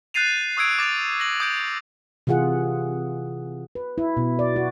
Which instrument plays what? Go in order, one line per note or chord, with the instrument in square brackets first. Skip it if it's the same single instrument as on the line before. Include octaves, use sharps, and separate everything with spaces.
[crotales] F#6 G6 A6 C7 D#7 F7
C#6 D#6 E6 G#6 D7
D6 A6 D7 F7
A#6 F#7
D#6 G6 D7
[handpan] C3 E3 F4 G#4 F#5
B4
E4
B2
D5
F#4